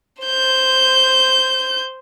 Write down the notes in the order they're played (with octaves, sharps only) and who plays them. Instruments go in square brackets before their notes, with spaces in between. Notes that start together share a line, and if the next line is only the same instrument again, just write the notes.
[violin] C5 G6